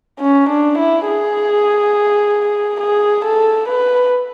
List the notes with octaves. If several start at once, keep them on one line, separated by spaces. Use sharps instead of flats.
C#4
D4
E4
G#4
G#4
A4
B4